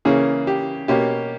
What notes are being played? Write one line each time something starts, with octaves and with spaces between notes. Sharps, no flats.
C#3 E3 A#3 C#4 G#4
G4
B2 A#3 C#4 G4